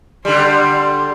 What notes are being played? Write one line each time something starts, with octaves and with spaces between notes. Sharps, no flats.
D3 G3 C6